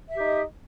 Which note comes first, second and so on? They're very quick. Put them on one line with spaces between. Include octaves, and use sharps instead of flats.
E5 G4 D#4 D#5